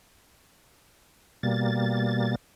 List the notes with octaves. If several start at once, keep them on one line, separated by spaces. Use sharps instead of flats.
B2 G3 A#3 A6